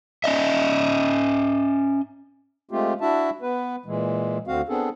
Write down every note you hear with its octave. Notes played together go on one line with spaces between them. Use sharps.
C#4 D#5 E5
G#3 A3 C4 F4 G4
D4 E4 F#4 E5 A5
B3 B4
A#2 E3 G#3
D2 D3 C4 F#4 F5
B3 C4 D4 G#4 A4